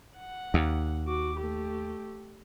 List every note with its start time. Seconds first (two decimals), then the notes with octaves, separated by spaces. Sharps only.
0.19 F#5
0.54 D#2
1.06 F#4 D6
1.37 A3 G4